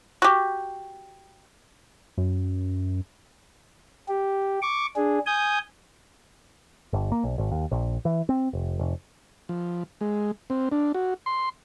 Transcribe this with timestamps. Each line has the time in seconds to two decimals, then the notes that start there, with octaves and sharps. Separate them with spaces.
0.22 F#4 G4
2.18 F#2
4.09 G4
4.62 C#6 D6
4.96 D4 G#4
5.26 G#5 D#6 G6
6.93 G1
7.12 A#3
7.24 B1
7.38 G#1
7.52 D#2
7.71 A#1
8.05 E3
8.29 C4
8.53 F1
8.79 F1
9.49 F3
10.01 G#3
10.50 C4
10.72 D4
10.94 F#4
11.26 C6